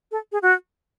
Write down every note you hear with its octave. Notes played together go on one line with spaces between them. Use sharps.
A4
G#4
F#4